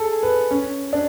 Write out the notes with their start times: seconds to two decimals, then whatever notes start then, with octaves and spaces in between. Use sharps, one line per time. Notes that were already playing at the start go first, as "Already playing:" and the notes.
Already playing: G#4 A4
0.23 B4
0.51 C#4
0.93 D4